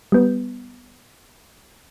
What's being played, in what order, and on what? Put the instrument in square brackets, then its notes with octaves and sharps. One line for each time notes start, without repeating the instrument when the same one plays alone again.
[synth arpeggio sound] G3 B3